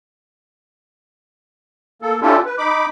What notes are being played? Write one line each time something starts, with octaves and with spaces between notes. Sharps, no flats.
A#3 A4
C#4 D4 E4 F4 G4 A4
B4
D#4 B5 D6